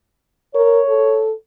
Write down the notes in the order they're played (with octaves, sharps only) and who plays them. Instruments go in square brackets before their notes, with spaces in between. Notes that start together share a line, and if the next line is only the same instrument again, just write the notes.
[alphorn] A#4 [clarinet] C#5
[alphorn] A4